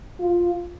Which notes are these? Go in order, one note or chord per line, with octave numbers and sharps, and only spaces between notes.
F4